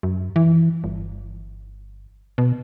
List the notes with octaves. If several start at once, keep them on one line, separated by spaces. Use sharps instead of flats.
F#2
E3
G1
B2